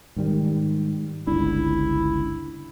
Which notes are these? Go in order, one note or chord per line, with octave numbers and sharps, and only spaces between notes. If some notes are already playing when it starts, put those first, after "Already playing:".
G#2 D#3 G3
G1 C#2 D4 E4